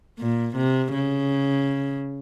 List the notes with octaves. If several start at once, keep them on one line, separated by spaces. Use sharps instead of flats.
A#2
C3
C#3